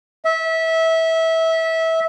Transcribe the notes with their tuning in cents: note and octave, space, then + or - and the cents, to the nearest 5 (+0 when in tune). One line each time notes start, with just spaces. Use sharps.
E5 -20